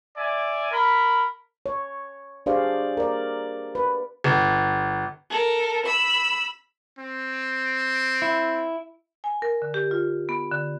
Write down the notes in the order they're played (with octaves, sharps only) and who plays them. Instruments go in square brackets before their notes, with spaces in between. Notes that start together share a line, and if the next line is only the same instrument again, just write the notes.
[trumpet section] D5 E5 G#5
A#4 B5
[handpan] C#5
D4 G4 G#4 C5 D5 F5
A#4 D5
B4
[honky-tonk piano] G1
[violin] A4 A#4
B5 E6
[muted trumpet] C4
[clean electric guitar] E4
[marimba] G#5
A#4
D3
G4
F4
B3
D3